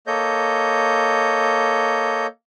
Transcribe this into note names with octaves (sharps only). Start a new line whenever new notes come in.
A#3 A4 C#5 D#5 G6